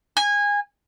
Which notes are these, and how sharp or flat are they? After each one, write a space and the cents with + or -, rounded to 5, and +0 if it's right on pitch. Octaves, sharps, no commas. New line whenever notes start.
G#5 -20